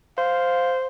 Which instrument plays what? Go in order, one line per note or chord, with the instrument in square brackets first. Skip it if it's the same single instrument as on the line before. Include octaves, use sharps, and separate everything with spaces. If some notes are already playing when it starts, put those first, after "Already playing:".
[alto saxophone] C5 [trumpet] F5